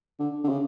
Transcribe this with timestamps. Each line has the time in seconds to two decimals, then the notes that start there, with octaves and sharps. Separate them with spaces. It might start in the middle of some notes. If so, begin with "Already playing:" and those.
0.20 D3
0.44 D3
0.49 C#3